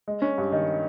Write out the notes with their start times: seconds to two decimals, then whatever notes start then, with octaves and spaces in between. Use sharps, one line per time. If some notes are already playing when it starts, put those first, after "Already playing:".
0.08 G#3
0.22 C#4
0.38 G2
0.52 D#3